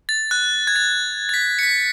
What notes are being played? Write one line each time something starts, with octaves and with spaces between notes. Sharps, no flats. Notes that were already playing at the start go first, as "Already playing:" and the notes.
A6
F#6
G#6
A6
A6
B6
C#7
B6